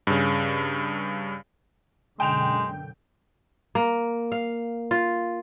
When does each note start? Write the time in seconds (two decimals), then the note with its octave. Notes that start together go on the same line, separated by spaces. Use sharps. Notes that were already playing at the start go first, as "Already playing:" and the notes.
0.07 G2 C#3
2.20 F#2 B2 D3 G#3 G5 E7 F7
3.75 A#3
4.32 F5
4.91 F4